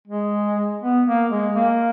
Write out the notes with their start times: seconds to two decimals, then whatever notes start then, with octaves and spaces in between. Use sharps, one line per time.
0.07 G#3
0.82 B3
1.07 A#3
1.31 G#3
1.56 A#3